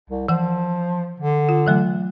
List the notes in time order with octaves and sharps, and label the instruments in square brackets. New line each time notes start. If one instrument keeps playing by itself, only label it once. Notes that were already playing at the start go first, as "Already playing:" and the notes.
[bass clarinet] C2
[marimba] E3 F#5 [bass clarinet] F3
[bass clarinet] D3
[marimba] F4
E3 F#3 A3